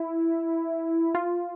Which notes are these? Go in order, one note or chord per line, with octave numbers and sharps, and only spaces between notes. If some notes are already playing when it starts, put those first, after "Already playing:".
Already playing: E4
F4